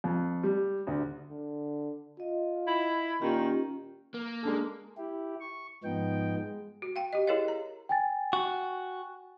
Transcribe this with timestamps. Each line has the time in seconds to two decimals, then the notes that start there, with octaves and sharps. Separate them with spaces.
0.04 F2
0.43 G3
0.87 D2
1.30 D3
2.20 F4 D#5
2.67 E4
3.22 A#2 D#3 C#4 F4 G4
4.14 A#3
4.43 G#3 D4 A4
4.97 E4 G4
5.40 C#6
5.84 G#2 F3 B3 D#4 G5
6.38 G#3
6.82 F#4
6.96 F5 G5
7.13 G4 D#5
7.27 E4 G#4 A#4 C#5 D#5 F5
7.48 A#5
7.89 G5 G#5 A6
8.33 F#4